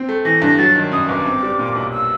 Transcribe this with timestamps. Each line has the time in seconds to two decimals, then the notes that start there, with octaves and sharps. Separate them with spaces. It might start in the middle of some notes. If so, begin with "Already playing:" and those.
Already playing: C4
0.09 A3
0.25 E3 A#6
0.42 G2
0.58 F#3 A6
0.76 D#3
0.92 F#2 D#6
1.09 G1 D6
1.26 C4
1.43 G3
1.59 A#2
1.76 B1
1.93 E6